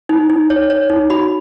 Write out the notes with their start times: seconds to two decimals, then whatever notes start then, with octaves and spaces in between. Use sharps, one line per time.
0.09 D#4
0.30 D#4
0.50 C#5
0.70 C#5
0.90 D#4
1.10 F#4 B5